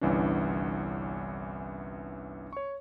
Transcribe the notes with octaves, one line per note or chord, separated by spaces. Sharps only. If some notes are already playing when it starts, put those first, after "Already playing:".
G1 C2 E3 C#4 D4
C#5 C#6